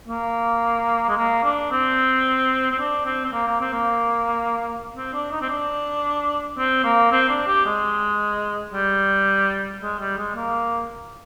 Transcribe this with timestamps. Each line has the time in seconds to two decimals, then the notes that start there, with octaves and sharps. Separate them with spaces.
0.08 A#3
1.09 G#3
1.17 A#3
1.44 D4
1.71 C4
2.71 C4
2.79 D4
3.06 C4
3.25 C4
3.32 A#3
3.47 A#3
3.60 C4
3.73 A#3
4.95 C4
5.13 D4
5.31 D#4
5.41 C4
5.49 D4
6.58 C4
6.84 A#3
7.12 C4
7.29 D4
7.47 G4
7.65 G#3
8.73 G3
9.82 G#3
9.99 G3
10.18 G#3
10.36 A#3